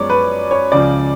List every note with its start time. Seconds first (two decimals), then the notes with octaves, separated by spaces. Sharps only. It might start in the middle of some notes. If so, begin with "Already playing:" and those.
Already playing: F#2 F3 G#3 B3 C#5 D5
0.10 B4
0.51 C#5
0.72 C#2 C#3 F3 D5